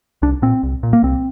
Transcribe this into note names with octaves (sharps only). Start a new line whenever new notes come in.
C2 D4
A#2 C4
C2
A#2
A#3
C2 C4